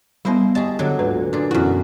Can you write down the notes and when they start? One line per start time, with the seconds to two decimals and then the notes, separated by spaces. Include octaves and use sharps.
0.25 G3 B3 E4 C5 D#5
0.55 G4 G#4 D#5 A5 C#6
0.79 D3 F#3
0.99 G#1 D2 A#2 B4
1.33 A#2 D4 G#4
1.51 F#2 B2 D3 E3 E4 F#4